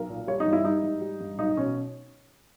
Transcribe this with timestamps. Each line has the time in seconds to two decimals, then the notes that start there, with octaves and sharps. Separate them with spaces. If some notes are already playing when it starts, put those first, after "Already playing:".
Already playing: B1 A#4
0.09 A#2
0.27 G3 C#5
0.40 D#4
0.46 G2
0.53 E4
0.65 G3 D#4
0.83 G#2
1.01 G3
1.20 G2
1.38 B1 D#4
1.57 B2 C#4